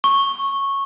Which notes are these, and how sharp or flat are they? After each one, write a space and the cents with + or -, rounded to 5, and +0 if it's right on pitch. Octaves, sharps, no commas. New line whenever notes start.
C#6 -10